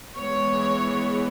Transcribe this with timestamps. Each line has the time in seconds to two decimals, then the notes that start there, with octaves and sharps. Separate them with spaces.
0.16 E3 G#3 B3 C#5